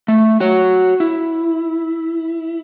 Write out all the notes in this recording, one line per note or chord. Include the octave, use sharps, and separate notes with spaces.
A3
F#4 C#5
E4